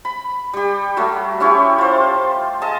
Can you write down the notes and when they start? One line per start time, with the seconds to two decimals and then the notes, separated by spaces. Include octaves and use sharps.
0.05 B5
0.53 G3 G4
0.97 F#3 G3 A3
1.40 C#4 E4 G4 C#5
1.78 F4 C5
2.62 G#4 D#5 A5